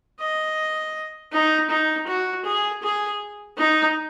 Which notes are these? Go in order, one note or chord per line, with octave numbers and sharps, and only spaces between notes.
D#5
D#4
D#4
F#4
G#4
G#4
D#4